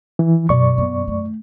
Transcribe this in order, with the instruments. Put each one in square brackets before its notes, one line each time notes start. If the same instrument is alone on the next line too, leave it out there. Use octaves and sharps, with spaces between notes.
[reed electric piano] E3
[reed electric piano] F#2 D5 C#6 [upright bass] B2
[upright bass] B3
A3